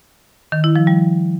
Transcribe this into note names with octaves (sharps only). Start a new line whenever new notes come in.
D#3
E4
F3
G3